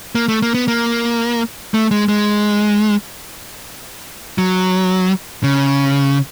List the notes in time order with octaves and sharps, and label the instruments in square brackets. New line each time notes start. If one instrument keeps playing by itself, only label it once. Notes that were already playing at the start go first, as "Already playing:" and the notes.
[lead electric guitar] A#3
A3
A#3
B3
A#3
A3
G#3
G#3
F#3
C#3